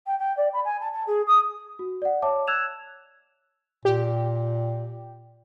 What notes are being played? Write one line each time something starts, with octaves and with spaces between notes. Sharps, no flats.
G5
G5
D5
B5
G#5
A5
A5
G#4
D#6
F#4
D5 F#5
C#5 E5 A5 D6
E6 F#6 G#6 E7 F7
A#2 G4